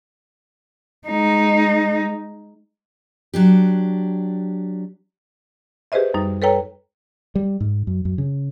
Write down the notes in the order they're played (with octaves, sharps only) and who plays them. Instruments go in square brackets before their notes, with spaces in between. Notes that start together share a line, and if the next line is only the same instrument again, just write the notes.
[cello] G#3 D#4
[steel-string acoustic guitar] F#3 D4 G4
[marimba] G4 G#4 B4 C5 D#5 E5
F#2 G3 D#4
A4 B4 C#5 G5 A#5
[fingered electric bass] G3
G#2
F#2
F#2
C#3